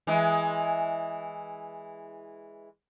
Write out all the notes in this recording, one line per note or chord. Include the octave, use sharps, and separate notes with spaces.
E3 G#3